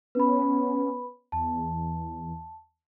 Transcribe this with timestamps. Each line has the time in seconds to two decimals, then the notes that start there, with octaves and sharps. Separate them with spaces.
0.15 B3 C#4 B4 B5
1.32 E2 A5